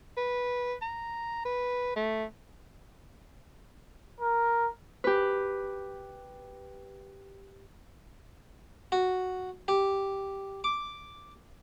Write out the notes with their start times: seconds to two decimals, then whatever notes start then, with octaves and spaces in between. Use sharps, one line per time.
0.17 B4
0.82 A#5
1.45 B4
1.96 A3
4.21 A#4
5.04 G4 B4
8.92 F#4
9.68 G4
10.64 D6